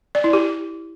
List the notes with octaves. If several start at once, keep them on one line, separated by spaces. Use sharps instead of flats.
D5
E4
G4